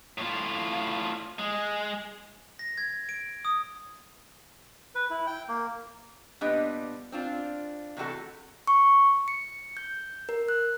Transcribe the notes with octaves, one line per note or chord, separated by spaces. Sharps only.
A2 F4
G#3
A#6
G#6
D7
D#6
B4
E4
G5
A#3
A#2 G3 B3 D4 B4 D#5
C4 D4 F4
C3 E3 A3 E4 F#4 A4
C#6
C#7
G6
A#4
F#6